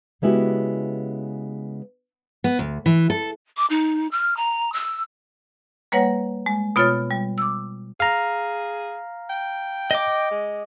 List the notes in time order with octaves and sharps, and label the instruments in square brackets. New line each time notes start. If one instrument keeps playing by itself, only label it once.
[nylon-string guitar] C#3 G#3 B3 E4 F#4 G4
[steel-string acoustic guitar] B3
D2
E3
A4
[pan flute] D6
D#4
F6
A#5
E6
[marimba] G3 A#3 B4 C#5 F#5 A#6
G#3
B2 B3 F4 C#5 F6 A6
G3
D6 E6
[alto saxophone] G#4 [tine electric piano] F5 A#5
[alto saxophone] G5
[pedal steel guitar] D#5 D6
[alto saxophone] G#3